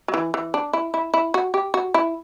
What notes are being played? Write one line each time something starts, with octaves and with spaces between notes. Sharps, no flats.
F#3
E3
E3
D4
E4
E4
E4
F#4
G4
F#4
E4